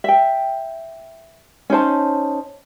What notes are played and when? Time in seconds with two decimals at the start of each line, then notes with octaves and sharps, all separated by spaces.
0.04 E5 G5
1.70 C#4 D#4 C5 A5